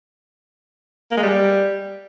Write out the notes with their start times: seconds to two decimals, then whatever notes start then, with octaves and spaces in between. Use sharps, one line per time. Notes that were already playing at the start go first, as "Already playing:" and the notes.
1.11 A#3
1.17 G#3
1.22 G3